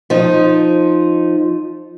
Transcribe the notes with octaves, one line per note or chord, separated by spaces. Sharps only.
F3 D#4